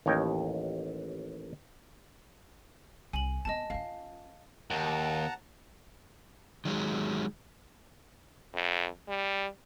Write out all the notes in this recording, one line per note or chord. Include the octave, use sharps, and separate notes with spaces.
A1 D#2 C#5 D#5 G5
C2 G#5 F#7
B3 C4 D#5 A5
C#4 F4 F5
D#2 F#5 A5 A#5
D#3 F#3 G#3
F2
G3